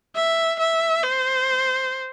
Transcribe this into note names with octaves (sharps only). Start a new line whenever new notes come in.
E5
E5
C5